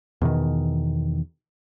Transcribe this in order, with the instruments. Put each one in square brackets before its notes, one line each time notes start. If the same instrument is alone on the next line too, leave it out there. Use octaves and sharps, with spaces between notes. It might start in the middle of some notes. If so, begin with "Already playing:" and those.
[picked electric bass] E2 B2 D#3